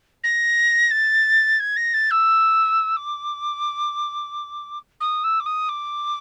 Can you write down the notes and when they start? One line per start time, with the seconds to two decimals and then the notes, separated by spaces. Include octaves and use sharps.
0.24 A#6
0.91 A6
1.60 G#6
1.77 A#6
1.94 A6
2.11 E6
2.97 D6
5.00 D#6
5.24 E6
5.40 D6
5.46 D#6
5.69 D6